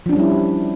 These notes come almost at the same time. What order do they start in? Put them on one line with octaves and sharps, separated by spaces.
F3 D4 C#4 G3 E4